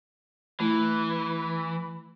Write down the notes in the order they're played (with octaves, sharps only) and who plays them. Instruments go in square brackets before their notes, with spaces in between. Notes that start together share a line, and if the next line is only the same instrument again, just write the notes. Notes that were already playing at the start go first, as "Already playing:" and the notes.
[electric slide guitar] E3 [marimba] A3 E4